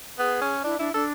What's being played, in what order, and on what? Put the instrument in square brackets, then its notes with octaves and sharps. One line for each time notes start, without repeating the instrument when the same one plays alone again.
[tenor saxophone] B3 [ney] G#4
[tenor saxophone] C#4
[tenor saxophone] D4 [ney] E4
[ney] D4 [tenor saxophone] E4
[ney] D4 [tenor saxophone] A4